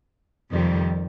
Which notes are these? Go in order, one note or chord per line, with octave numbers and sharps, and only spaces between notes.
F2 C3 D#3 G3